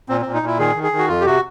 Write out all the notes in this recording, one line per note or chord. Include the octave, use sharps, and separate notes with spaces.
A#2 C4
A#2 C4
D#4
A#2 E4
D#3 G#4
D#3
G#4
D#3
F#4
F2 F4
G4
C3 F#4